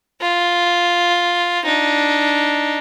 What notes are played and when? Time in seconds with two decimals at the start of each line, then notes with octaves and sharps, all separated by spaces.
0.22 F4
1.65 D4 D#4